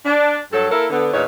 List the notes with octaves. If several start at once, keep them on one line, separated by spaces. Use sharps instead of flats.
D4
G2 F#3 A4
A#3 E4 A4 A#4
D3 B3
E2 A#2 D#4 B4 C#5